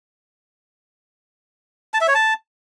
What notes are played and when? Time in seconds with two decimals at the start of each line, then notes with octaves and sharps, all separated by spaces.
1.94 A5
2.01 E5
2.08 C#5
2.15 A5